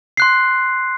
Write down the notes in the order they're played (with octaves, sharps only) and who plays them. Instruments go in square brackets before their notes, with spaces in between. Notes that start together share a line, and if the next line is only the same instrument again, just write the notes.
[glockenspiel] C6 F#6 C7